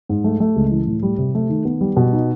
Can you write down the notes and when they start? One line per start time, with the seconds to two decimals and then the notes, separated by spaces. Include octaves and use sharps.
0.09 G#2
0.24 A3
0.40 A3
0.56 C#2
0.71 E3
0.87 A2
1.03 G3
1.18 C3
1.35 A3
1.49 D#3
1.65 B3
1.81 G3
1.97 B2
2.12 D#4